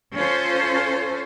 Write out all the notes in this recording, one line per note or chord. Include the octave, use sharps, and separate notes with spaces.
C#4 F4 A4 C5